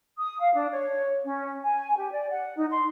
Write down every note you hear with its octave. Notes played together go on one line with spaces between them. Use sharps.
D#6
F5
D4
C#5
C#4
G#5
G4
D5
F#5
D#4
C6